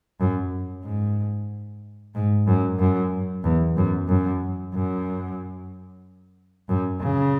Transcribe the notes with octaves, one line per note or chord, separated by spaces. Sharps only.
F#2
G#2
G#2
F#2
F#2
E2
F#2
F#2
F#2
F#2
C#3